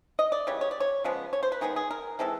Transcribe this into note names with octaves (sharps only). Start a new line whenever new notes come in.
D#5
D5
C#3 E3 G3 C#5
C#5
D5
C#5
C#3 F3 G#3 B3
C#5
C5
B4
D#3 G#3 B3 G#4
G#4
A#4
E3 G#3 C4 A4